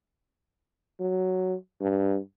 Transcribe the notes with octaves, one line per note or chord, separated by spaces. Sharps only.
F#3
G2